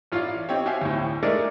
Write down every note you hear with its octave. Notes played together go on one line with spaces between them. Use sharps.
A1 F4 D5 F5
C4 D#4 G4 C#5
F#4 G4 E5 F5 G#5
D2 A2
G#3 A3 D4 D#4 A#4 D5